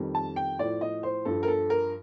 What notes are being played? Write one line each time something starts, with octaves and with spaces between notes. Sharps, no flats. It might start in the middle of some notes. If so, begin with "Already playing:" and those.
Already playing: F2 D#3 G3
A5
G5
A2 F3 D5
D#5
C5
G2 F3 A4
A#4
A4
A#4